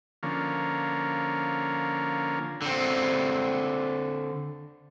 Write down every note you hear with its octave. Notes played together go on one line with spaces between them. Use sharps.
D3 F3 A#3 C#4
D3 C4